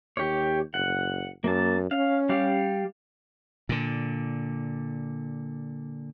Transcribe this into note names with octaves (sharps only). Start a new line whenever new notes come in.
D#2 G4 C#5
F#1 F#5
F#2 A#3 A5
C#4 F5
G3 G4 F5
A#2 D3